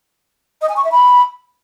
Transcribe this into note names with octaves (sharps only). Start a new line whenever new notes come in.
D#5
G#5
C#6
E5
B5